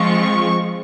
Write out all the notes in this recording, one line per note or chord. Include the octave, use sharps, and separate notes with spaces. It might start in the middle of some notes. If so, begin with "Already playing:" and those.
Already playing: F3 G#3 C4 F4 C#6